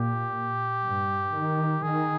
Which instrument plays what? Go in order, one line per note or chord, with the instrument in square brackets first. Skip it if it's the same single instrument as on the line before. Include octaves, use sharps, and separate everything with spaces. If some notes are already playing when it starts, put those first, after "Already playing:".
Already playing: [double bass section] A#2 [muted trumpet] G4
[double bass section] G2
D#3
[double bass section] D#3 [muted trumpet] G#4